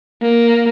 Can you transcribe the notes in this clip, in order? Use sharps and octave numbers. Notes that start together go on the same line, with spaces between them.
A#3